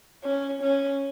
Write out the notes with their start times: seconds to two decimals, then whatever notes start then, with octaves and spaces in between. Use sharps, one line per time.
0.24 C#4
0.62 C#4